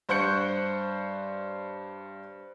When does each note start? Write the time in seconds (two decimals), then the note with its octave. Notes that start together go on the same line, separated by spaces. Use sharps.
0.09 G2 C5 C#6 F#6 G6 C#7